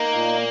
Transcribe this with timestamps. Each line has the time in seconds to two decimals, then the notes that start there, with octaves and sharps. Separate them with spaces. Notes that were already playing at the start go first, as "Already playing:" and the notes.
Already playing: A#3 D#4
0.13 A#2